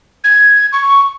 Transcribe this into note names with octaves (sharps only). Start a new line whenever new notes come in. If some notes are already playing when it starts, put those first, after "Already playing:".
G#6
C#6